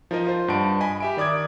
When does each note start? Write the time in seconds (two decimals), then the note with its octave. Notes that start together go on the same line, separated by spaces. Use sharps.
0.11 F3 D#4 A#4 D#5
0.27 F4 C5
0.48 G2 F#5 A5 D7
0.80 D#5 G#5 B5
1.00 G4 E5 D7
1.17 D#3 D5 D6 D#6 G#6